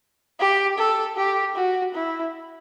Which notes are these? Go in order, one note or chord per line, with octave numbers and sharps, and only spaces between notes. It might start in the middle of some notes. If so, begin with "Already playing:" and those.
G4
A4
G4
F#4
E4